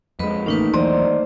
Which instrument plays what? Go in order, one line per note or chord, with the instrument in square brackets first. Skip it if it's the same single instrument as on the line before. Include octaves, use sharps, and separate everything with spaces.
[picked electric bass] F2 G#3 [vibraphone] B4 D#5 B5
[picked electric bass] A1 [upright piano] D#3 A3 A#3 [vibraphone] C#4 D#4 B4
[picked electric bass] E1 B1 E3 [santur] C5 [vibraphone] D5 D#5 A#5